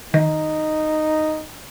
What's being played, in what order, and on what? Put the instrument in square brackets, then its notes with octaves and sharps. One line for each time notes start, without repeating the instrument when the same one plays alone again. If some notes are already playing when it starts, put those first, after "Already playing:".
[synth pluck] D#3 [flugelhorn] D#4